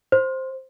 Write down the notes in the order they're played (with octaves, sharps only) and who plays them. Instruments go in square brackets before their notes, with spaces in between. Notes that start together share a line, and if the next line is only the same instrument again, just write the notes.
[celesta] C5